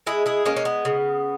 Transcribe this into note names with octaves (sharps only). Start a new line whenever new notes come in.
G#3 E4 G#4
E4 G#4
G#3 A#3 C#4
C#4
B3
C#3